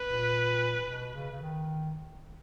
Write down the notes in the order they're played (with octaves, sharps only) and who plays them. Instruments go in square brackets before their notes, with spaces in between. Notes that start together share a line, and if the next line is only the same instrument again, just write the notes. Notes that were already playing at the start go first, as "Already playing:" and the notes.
Already playing: [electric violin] B4
[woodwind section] A#2
B2
C#3
C#3
D#3